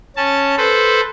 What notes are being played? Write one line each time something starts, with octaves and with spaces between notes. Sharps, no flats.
C#4 A5
A4 B4 C5